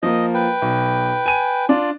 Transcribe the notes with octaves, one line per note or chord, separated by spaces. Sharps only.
F3 A#3 D#5
B4 G5
B1
G#5 D#7
D4 F4 D5